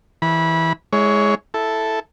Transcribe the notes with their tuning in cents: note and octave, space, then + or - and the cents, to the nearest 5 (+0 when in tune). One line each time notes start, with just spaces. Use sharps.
E3 -10 B5 -25
G#3 +5 E4 -20 C#5 +20
E4 +0 A4 +0